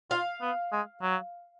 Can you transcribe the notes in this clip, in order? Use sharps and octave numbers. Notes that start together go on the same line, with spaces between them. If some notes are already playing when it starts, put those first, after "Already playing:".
F4 F5
B3
G#3
F#3